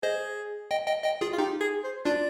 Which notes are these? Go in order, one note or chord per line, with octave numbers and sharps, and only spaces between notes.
G#4 C5 D#5
D#5 G5
D#5 G5
D#5 G5
F4 G#4
F4
D#4 G4
G#4
C5
D4 F4 D5